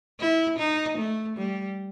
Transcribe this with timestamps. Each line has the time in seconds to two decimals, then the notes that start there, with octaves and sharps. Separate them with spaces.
0.20 E4
0.59 D#4
0.98 A3
1.38 G3